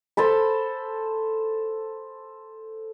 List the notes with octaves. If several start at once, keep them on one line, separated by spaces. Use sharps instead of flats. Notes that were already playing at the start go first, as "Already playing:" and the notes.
A4 C5 A5 B5